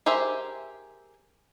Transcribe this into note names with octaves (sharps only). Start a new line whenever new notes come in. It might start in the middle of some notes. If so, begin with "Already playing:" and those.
G4 G#4 A#4 C5 E5